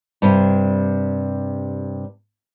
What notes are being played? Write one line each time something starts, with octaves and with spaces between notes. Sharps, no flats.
G2 C3